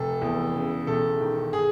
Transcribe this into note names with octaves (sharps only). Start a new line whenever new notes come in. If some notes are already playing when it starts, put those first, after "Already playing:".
Already playing: F1 A4
E2
C#3
E1 A4
D#3
G#4